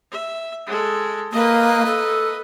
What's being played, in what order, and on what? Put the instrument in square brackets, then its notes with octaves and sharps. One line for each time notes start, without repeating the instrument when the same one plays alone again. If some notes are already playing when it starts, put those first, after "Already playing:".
[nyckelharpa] E5
G#3 A4
[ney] A#3 [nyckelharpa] B4 D#5
[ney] A4